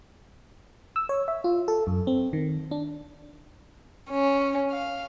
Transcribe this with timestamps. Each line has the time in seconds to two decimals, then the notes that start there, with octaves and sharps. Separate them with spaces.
0.96 E6
1.09 C#5
1.28 E5
1.44 F4
1.68 A4
1.87 F#2
2.07 C4
2.33 D#3
2.71 D4
4.10 C#4
4.71 F5